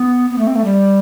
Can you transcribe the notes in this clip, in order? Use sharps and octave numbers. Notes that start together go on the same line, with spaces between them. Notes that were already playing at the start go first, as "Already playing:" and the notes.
Already playing: B3
B3
A3
C4
A3
G3